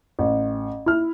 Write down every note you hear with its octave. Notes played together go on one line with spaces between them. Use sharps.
A1
E4 F6